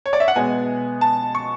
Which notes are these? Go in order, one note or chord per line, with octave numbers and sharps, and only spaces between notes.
C#5
D5
E5
F#5
B2 G#3 B3 G#5
A5
C#6